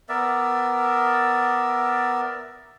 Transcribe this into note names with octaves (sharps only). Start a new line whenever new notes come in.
B3 A#4 D5 E5